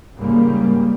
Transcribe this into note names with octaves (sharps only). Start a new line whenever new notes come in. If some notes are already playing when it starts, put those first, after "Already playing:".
G#2 C#3 G3 A#3